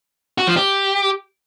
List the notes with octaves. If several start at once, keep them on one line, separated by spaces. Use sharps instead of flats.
F#4
F3
G4